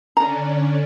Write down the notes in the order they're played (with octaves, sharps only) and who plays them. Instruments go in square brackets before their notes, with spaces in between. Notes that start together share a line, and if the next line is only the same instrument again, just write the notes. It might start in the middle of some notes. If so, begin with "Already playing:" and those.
[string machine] D3 C#4 D4 [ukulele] A#5